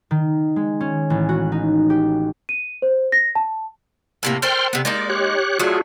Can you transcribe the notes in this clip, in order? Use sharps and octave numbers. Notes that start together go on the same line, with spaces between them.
D#3
G#3
C#4
A1
F#4
D#4
G4
D#7
C5
A#6
A5
A2 C3 A#3
A4 A#4 C5 G5 C6 F6
C3 B3
G#3 A#3 D#4 D5
G4 C#5 F#6
F#3 A3 F4 F#4 G#4